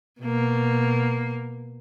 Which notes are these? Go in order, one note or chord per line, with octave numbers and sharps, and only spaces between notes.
B2 A#3